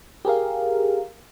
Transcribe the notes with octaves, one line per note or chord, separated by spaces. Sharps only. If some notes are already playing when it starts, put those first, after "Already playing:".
G4 G#4 A#4 F5